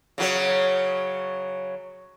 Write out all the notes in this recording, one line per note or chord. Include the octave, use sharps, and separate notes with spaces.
C#3 F#3 C#5